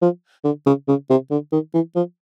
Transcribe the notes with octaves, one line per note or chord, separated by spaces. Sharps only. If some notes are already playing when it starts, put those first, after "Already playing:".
F3
D3
C#3
C#3
C3
D3
D#3
E3
F3